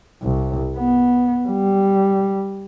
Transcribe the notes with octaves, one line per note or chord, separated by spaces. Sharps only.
C2
B3
G3